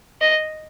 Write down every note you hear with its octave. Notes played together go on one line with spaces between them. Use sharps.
D#5